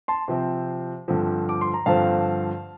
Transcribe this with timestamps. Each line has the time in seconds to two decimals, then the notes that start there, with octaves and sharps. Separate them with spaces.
0.08 A5 C6
0.28 C3 F3 C4
1.08 G2 D3 F3 C4
1.49 D6
1.61 C6
1.74 A#5
1.86 G2 D3 F3 C4 F5 A5